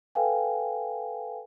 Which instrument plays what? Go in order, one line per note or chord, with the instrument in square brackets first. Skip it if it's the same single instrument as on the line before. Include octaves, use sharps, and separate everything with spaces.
[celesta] A4 B4 F5 G5 G#5